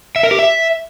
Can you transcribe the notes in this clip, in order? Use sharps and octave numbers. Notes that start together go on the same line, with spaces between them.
E5
A#4
G4
E5